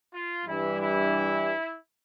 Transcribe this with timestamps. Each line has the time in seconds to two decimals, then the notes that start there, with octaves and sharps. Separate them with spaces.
0.13 F4
0.46 G2 E3 G3 E4
0.80 E4